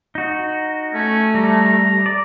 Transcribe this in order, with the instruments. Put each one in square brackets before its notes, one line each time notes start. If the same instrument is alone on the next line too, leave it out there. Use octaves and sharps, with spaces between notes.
[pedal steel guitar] D#4 F#4
[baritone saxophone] A3 [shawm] C#4
[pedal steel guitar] G3 [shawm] A#5
[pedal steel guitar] D5